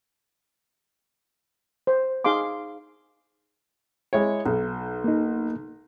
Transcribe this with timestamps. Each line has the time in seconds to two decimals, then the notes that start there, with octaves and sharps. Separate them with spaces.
1.87 C5
2.24 D#4 G#4 F5 C6 D6
4.13 G#3 E4 C#5
4.46 B1
5.04 A#3 D#4